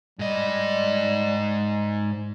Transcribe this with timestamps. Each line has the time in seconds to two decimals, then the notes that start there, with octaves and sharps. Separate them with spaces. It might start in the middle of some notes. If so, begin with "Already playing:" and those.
0.19 G#2 G3 D#5